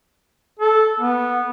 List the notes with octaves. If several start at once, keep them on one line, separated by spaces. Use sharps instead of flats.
A4
B3